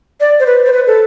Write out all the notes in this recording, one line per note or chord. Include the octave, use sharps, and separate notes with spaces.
D5
C5
B4
C5
B4
A4